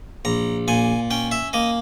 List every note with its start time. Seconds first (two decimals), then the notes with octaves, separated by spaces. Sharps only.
0.25 A#1 A#5
0.68 A#2 G#5
1.11 C#4 G5
1.31 E5
1.53 A#3 D#5